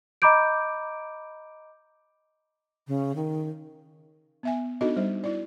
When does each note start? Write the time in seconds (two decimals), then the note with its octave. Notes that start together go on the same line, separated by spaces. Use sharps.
0.22 D#5 A#5 B5 D6 G6 D7
2.87 C#3
3.16 D#3
4.43 B3 E5 G#5
4.81 B3 D4 D#4 F#4 A4 D#5
4.96 G3 C5
5.24 E4 D5